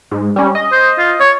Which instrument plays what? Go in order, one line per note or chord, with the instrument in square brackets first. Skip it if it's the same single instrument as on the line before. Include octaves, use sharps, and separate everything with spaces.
[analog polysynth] G#2
G3 C#4
D#5
[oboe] C5
F4
C#5